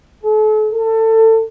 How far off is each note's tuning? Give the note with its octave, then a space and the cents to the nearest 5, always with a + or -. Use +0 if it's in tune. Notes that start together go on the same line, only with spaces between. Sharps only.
A4 -40
A4 +25